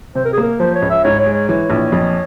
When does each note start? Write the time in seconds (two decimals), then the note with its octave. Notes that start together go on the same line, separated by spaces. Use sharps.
0.15 C3 C5
0.25 A#4
0.33 G#4
0.38 A#3 A#4
0.60 F3 C5
0.75 C#5
0.82 C#2
0.90 E5
1.04 G#2 C#5
1.19 C#5
1.26 G#3
1.34 C#5
1.49 E3 C#5
1.70 A#1
1.92 F2